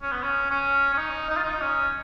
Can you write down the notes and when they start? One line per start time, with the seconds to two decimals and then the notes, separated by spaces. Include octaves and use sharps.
0.02 C#4
0.12 B3
0.23 C#4
0.50 C#4
0.93 C#4
0.97 D#4
1.30 D#4
1.37 F4
1.44 D#4
1.61 C#4